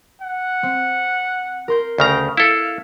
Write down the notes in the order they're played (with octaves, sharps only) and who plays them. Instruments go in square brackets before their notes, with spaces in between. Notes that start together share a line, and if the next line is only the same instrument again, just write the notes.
[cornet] F#5
[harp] C4
A#4 C6 G6
[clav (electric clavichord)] D2 C#3 A#5 [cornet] G5
[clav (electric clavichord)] E4 A4 [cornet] F5 [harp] E7